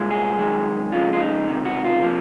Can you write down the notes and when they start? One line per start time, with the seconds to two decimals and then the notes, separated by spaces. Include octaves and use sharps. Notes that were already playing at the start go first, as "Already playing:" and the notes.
Already playing: C2 A#2 G#3
0.10 G#4
0.37 F#2 D#3 G#3
0.92 F2 C#3 G#3 F4
1.13 F4
1.20 D#4
1.47 C#2 C3 D#3
1.65 F#4
1.84 F4
2.03 C3 F3 A#3